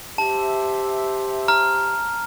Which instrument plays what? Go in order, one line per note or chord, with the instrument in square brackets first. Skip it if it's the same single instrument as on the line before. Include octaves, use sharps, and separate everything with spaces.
[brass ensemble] G4 C5 E5 [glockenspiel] A5
[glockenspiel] A#5 F6